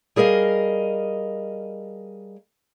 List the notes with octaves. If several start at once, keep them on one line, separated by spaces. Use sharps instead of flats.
G3 G#4 A#4 D#5 F5